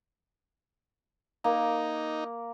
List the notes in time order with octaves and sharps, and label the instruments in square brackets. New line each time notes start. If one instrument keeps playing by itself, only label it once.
[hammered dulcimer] A#3 [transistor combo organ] D#4